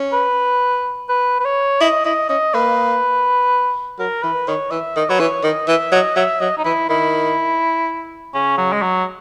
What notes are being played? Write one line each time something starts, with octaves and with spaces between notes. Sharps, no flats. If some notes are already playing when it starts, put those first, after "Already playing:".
Already playing: C#4
B4
B4
B4
C#5
E4 D#5
E4 D#5
C#4 D#5
A#3 B4
F#3 A#4
E3 B4
D#3 C#5
E3 E5
D#3 D#5
F#3 B4
E3 C#5
D#3 D#5
E3 E5
F#3 D#5
F#3 E5
F#3 D#5
D#4
E3 E4
D#3 E4
C#3 C#4
F#3
G#3
F#3